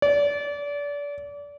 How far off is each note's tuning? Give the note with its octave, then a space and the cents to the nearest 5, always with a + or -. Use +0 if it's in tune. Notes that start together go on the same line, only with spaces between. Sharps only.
D5 -30